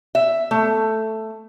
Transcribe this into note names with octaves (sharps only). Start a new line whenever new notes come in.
E5
A3